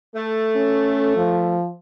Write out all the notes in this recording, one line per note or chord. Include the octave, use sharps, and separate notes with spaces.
A3
C#4
F3